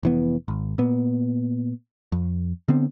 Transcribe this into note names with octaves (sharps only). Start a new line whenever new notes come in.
F1 E3 B3
G#1
A#2 B3
F2
D3 B3 C4